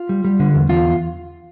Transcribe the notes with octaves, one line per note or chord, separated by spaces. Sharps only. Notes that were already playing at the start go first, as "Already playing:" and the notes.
Already playing: F4
G3
G3
D3
E2
E2 F4